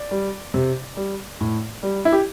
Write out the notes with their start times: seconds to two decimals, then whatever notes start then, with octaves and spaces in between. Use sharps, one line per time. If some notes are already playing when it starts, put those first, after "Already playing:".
Already playing: D5
0.11 G3
0.54 C3
0.97 G3
1.40 A2
1.83 G3
2.05 E4
2.12 G4